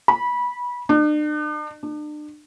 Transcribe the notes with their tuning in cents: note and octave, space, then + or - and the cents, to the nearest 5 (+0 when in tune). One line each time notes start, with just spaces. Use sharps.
B5 -20
D4 +45
D4 +40